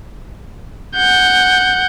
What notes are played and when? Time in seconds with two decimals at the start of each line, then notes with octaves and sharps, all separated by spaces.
0.96 F#5 G6